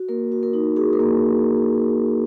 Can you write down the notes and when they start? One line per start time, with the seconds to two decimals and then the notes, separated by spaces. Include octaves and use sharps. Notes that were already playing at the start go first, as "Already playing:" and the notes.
Already playing: F#4
0.09 A#3 A#4
0.32 F#4
0.43 A#4
0.53 D#4
0.76 F#4 G#4
0.93 A#4
0.99 A#3